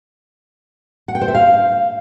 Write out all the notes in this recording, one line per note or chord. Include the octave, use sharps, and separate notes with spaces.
F#5
G5
C5
E5
F5